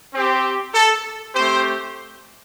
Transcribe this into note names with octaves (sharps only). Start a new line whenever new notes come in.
C4 G4
A4
A3 C4 G4 C5